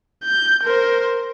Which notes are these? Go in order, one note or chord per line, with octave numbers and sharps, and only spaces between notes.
G6
A#4 C5